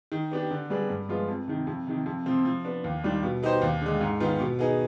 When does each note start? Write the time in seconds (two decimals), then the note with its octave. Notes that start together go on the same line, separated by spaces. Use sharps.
0.12 D#3
0.32 B3 D4 G4
0.50 D3
0.70 G3 B3 D4 G#4
0.89 G2
1.09 F3 G#3 B3 F4
1.28 F2
1.48 C3 D#3
1.67 F2
1.87 C3 D#3
2.06 F2
2.26 C3 F3 C4
2.45 F3
2.65 B3 D4
2.84 D#2
3.03 D#3 G3 D4 F4
3.23 B2
3.43 B3 D#4 G4 C5
3.62 D#2
3.81 D3 G#3
4.01 G#2
4.20 D#3 B3 F4
4.40 B2
4.59 B3 D#4 G#4